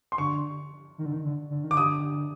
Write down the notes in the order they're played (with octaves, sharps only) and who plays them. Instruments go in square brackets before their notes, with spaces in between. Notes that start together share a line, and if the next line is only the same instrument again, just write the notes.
[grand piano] C6
[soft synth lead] D3 [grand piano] C#6
[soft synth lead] D#3
D3
D#3
D3
D3
D#3
[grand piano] D6
[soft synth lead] D3 [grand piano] D#6